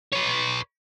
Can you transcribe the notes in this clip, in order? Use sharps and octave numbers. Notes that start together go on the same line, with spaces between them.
B4 C#5